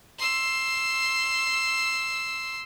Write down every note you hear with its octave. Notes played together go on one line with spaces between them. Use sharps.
C6 E6